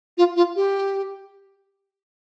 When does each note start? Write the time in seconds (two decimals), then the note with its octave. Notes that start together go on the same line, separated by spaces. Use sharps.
0.18 F4
0.36 F4
0.56 G4